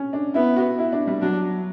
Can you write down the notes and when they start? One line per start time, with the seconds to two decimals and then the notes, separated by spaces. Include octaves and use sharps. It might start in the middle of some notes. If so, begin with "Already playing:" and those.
Already playing: C#4
0.13 D4
0.34 B3 E4
0.56 F#4
0.79 E4
0.92 D4
1.07 G3
1.21 F#3 D4